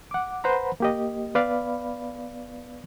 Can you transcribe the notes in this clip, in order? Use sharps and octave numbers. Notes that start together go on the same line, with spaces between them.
F#5 D6
B4 C5 F#5 A#5 B5
A#3 G4 D#5
B3 B4 D5 F5 B5